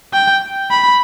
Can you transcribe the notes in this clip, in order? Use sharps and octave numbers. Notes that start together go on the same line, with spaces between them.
G5
B5